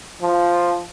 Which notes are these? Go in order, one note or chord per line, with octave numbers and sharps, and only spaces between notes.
F3